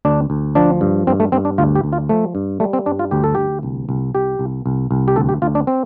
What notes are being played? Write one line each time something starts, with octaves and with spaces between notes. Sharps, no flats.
D2 D4
D2
F3 D4
G2
G2 C4
A3
G2 C4
D4
D2 F4
G4
D2
F4
F3 A3
G2
G3 A3
C4
G2 D4
F4
D2 G4
A4
D2 G4
C2
C2
C2 G4
C2
C2
C2
G4
D2 A4
G4
D2 F4
D4
C4